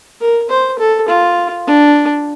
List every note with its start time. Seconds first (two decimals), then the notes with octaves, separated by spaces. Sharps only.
0.21 A#4
0.50 C5
0.79 A4
1.09 F4
1.67 D4